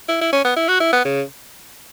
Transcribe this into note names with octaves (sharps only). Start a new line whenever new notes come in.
E4
E4
C#4
B3
E4
F#4
E4
B3
C#3